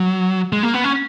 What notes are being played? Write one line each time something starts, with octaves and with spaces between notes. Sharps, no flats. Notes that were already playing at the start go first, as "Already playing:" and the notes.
Already playing: F#3
G#3
A#3
B3
C#4